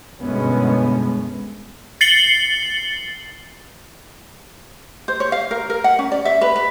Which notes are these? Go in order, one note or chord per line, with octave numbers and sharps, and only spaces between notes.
G1 F#2 B2 G#3 B3 C#4
A6 C7 C#7 F#7 G7
C5
C#5
F5
A#4
A#4
F#5
C#4
D5
E5
B4
B4